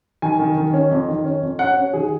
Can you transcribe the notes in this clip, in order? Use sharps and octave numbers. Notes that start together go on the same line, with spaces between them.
D#3 G#5
D#3
D#3
C#4
F2
D#3
C#4
F2
C#4 F#5
C#4
D#3 G#4